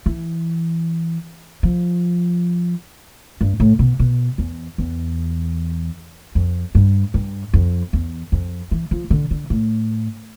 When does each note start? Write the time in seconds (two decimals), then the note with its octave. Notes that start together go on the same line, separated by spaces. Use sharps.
0.06 E3
1.63 F3
3.41 G2
3.60 A2
3.79 B2
3.99 B2
4.38 E2
4.78 E2
6.35 F2
6.75 G2
7.14 G2
7.54 F2
7.93 E2
8.32 F2
8.71 E3
8.91 F3
9.10 D3
9.31 D3
9.50 A2